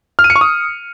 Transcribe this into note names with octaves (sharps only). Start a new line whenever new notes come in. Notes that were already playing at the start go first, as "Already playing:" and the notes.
F6
D#7
C#7
C#6
D#6